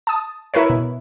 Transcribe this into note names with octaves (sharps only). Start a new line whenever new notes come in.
A5 D#6
E4 A#4 B4 C#5
B2